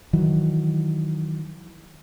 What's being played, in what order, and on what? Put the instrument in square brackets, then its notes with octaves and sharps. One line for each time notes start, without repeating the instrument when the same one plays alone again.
[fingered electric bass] D#3 E3 F#3